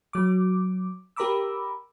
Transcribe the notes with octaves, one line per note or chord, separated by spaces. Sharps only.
F#3 D6
G4 A#4 A#5 B5 D6 E6